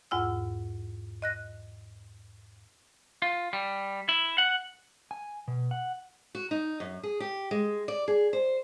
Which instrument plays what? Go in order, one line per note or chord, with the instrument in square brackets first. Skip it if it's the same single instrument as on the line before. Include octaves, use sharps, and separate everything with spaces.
[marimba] E2 G#2 F4 F#5 E6
D#5 F#6 A#6
[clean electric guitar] F4
G3
E4
F#5
[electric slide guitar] G#5
B2
F#5
[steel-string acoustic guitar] F#4
D#4
F#2
G#4
G4
G#3
D5
G#4
C5